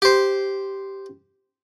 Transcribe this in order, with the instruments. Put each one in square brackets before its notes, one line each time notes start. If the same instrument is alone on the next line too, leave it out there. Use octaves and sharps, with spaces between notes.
[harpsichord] G4 C5